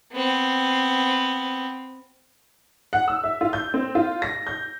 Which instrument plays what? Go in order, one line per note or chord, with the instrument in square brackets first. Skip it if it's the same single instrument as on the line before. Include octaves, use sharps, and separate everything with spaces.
[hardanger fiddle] B3 C4
[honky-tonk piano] F#5
E6
E5
F4
G6
C4
F4
A#6
G6